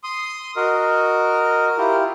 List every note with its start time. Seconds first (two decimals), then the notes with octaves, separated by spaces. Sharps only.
0.04 C6 D#6
0.56 F#4 A#4 D#5
1.78 E4 F4 G4